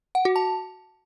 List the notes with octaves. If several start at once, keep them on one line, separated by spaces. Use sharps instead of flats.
F#5
F#4
A5